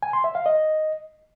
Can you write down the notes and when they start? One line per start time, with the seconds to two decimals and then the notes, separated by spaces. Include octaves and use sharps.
0.03 G#5
0.13 C6
0.24 E5
0.35 F5
0.46 D#5